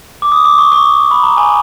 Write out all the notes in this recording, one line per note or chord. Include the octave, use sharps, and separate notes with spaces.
D6
D#6
D6
C#6
C#6
B5
A#5
G#5